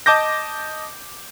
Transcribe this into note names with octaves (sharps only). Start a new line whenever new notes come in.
D#5 A5 D6 G6 A#6